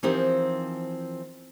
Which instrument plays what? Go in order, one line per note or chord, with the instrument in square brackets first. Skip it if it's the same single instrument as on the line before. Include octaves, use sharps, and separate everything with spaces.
[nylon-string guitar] E3 F3 C4 D#4 G4 A#4